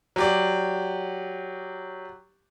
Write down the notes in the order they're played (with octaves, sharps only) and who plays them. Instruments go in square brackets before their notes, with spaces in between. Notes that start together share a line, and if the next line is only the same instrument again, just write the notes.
[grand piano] F#3 G4 D5